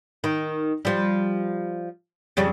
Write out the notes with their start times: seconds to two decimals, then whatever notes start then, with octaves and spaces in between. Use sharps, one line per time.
0.24 D#3
0.85 F3 G3
2.37 F2 C#3 G3